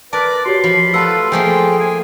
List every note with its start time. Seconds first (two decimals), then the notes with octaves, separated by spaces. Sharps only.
0.13 A#4 B4 D5 A5 D6
0.46 F#4 G4 C#5 C6
0.64 F3 B5
0.94 A3 F4 A4 B4 F#5 A5 E6
1.32 F3 A3 A#3 G#4 C5 G5
1.80 G#5